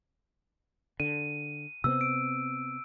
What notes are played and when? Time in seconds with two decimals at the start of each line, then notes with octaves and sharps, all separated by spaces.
1.00 D3 D#7
1.84 C3 B3 C4 E6
2.01 D7